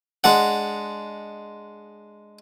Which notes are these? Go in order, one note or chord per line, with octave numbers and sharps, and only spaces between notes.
G#3 D4 F#5